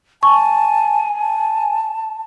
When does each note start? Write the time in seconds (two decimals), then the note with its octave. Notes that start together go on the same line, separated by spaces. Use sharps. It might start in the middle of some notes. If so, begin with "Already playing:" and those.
0.23 G#5 A5 C#6
1.20 A5